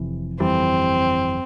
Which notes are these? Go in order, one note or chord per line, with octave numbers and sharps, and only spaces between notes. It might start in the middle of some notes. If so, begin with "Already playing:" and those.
Already playing: F1 F2 C3 E3
G1 F2 E3 G3 C4